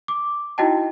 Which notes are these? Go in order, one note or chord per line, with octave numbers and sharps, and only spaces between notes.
D6
D#4 E4 F#4 D#5 G5 A5